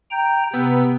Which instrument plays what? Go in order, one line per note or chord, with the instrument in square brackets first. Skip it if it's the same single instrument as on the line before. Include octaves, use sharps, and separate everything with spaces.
[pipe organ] G5 A#5 G6
[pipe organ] C3 E6 [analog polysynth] B3